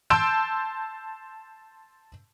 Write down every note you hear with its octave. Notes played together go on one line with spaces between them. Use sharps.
A5 C6 E6 G6 D7 E7